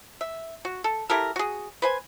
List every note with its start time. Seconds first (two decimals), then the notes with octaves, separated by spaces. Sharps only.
0.21 E5
0.65 F#4
0.84 A4
1.10 E4 G4 A4 A#4
1.36 F#4 G#4
1.82 B4 C5 G#5